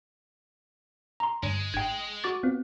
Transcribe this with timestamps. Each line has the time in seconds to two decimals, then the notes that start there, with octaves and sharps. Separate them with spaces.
1.20 A#5 C6
1.43 G2 D3 G#3
1.74 G#1 G5 G#6 C7
2.24 F#4 D6 A6
2.43 B3 C4 F4